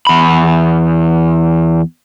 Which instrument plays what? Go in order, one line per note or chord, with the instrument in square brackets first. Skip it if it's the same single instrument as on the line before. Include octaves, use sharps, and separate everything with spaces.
[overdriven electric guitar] E2 B5